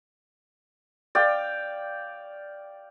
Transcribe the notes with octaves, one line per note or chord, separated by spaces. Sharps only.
D5 F5 G5